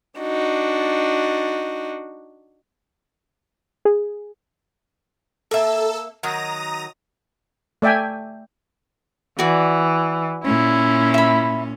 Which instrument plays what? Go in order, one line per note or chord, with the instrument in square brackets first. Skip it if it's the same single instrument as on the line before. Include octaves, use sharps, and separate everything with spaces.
[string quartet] D4 D#4 F#4
[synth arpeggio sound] G#4
[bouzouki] A#3 E5 [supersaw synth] A4 E6
[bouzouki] D#3 F#3 [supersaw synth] A#5 D#6 A#6
[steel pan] A3 D5 E5 G5 G#5
[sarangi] E3 [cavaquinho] F#4 D5
[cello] A#2 C#4 [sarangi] E4
[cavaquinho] E5 B5